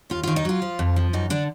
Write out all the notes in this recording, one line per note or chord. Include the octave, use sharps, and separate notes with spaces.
D#2 F4
F4
D#3
D#4
F#3 F4
F3
F2
F3
F#2 D#4
D3 D4